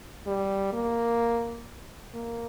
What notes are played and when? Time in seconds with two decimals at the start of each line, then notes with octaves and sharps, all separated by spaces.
0.27 G3
0.73 A#3
2.14 A#3